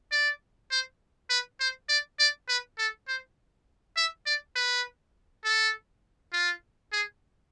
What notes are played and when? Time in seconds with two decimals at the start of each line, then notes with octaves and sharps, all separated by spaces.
0.11 D5
0.71 C5
1.30 B4
1.60 C5
1.89 D5
2.19 D5
2.48 B4
2.78 A4
3.08 C5
3.97 E5
4.26 D5
4.56 B4
5.45 A4
6.33 F4
6.92 G#4